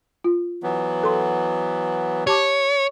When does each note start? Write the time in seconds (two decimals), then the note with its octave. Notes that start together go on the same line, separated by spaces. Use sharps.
0.24 F4
0.63 E3 F#3 B3
1.03 A4 C6
2.27 G4 C#5 A5 D6